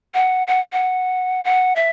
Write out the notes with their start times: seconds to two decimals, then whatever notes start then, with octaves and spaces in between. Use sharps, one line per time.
0.14 F#5
0.47 F#5
0.72 F#5
1.44 F#5
1.76 E5